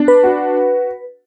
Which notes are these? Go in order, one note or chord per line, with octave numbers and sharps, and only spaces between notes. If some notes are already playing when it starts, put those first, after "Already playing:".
Already playing: D4
B4
F#4